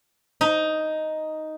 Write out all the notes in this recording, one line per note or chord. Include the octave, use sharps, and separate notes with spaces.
D#4